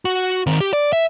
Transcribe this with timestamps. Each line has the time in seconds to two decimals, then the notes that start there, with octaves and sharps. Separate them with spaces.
0.05 F#4
0.47 D#3 C4
0.61 G4
0.73 D5
0.93 E5